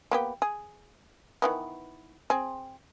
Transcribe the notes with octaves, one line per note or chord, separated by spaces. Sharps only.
A#3 B3 G4
G#4
D#3 E3 B3
C4 G#4